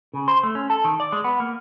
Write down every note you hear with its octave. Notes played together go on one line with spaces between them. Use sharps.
C#3
C5
A3
C#4
A4
D#3
D5
G#3
B3
A#3